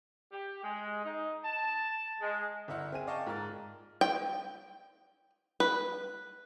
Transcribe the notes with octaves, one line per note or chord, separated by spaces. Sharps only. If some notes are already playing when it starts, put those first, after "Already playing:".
G4
G#3
D#4
A5
G#3
G1 E4 E5 F#5 F6
C4 G#4 D#7
D5 D#5 F5 G5 A5 C#6
G#2 F4 A#4 F6 A6
G5
B4